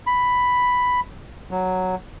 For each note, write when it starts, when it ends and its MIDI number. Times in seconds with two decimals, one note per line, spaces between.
0.07 1.00 83
1.51 1.95 54